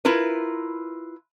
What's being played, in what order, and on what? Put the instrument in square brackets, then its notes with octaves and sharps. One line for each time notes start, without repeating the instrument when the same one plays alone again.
[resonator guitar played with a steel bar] E4 F4 A#4 B4